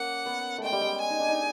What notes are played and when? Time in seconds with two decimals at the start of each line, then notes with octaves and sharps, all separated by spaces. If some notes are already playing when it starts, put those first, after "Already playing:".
Already playing: A#3 C#4 F#5
0.26 B3
0.58 A3
0.63 G#3 G5
0.73 G3
0.81 G#3
1.01 G#5
1.10 D#4
1.20 D4
1.28 D#4